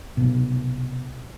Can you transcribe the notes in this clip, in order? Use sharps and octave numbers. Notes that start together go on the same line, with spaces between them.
C2 B2